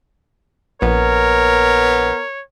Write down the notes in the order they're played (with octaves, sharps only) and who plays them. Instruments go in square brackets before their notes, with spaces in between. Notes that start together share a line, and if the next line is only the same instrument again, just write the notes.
[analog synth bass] A#1 [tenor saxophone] B3 [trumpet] A#4 [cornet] C#5